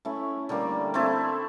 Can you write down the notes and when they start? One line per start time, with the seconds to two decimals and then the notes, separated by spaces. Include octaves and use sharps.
0.05 A3 C#4 E4
0.49 D3 G3 A#3
0.94 A3 C4 E4 A4